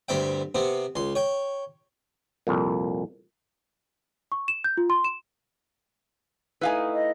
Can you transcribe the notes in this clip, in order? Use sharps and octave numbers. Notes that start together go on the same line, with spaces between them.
D2 G2 C4 E5 G5
C3 B3 C4
C#2 C6
C#5 G5
C2 F2 A#2
C#6
E7
G6
F4
C6
E7
A3 D#4 E4 B4 F5 G#5
D#5